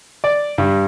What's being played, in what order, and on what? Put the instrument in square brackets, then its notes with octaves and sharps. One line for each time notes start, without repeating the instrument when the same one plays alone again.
[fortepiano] D5
G2